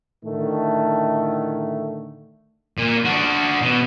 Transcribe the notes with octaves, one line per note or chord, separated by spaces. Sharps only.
A2 D3 D#3 A3
A#2
D4 F#4
B2